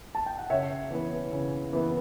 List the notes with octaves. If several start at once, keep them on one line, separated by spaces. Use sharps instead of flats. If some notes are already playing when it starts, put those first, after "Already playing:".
A5
G5
F#5
C#3 C#5 E5
E3 B3
C#3
E3 B3